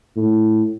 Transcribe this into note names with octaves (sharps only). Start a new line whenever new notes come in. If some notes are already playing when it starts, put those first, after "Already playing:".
A2